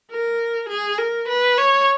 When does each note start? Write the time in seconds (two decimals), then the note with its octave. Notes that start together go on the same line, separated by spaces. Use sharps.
0.11 A#4
0.69 G#4
0.98 A#4
1.28 B4
1.58 C#5